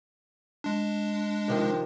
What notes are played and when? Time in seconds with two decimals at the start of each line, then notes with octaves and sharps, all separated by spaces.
0.64 G#3 D4
1.48 C3 D#3 F3